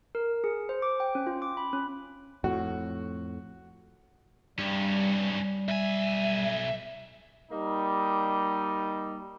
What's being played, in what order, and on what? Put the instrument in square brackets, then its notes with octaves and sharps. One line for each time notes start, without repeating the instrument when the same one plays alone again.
[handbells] A#4
G#4
C5
D6
G5
C#4
F4
D6
B5
C#4
[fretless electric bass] F2 A2 [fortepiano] F#4
[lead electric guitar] G2 [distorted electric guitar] C3 C#4 [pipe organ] G3
[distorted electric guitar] B1 G#5 [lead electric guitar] E5
[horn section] G3 A#3 D#4